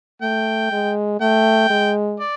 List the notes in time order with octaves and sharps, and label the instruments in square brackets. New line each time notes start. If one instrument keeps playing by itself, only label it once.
[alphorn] A3 [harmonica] G5
[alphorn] G#3
[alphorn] A3 [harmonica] G5
[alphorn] G#3
[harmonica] D5